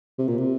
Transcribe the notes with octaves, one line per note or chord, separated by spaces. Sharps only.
C3
A#2
C3